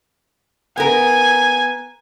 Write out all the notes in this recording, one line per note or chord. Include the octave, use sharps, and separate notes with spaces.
B3 A#4 G#5